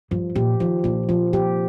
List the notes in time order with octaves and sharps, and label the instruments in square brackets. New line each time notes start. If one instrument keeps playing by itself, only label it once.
[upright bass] G2 [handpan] F3
[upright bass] A#2 [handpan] G4
[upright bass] D#3 [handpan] F3
[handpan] A#2 [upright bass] D#3
[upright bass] D3 [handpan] F3
[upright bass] C3 [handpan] G4